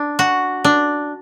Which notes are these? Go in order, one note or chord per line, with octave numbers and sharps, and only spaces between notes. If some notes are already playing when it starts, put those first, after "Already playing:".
Already playing: D4
F#4
D4